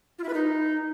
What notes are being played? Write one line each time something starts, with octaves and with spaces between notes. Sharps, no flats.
F4
E4
B4
D#4